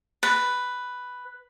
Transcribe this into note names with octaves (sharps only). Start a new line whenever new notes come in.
B4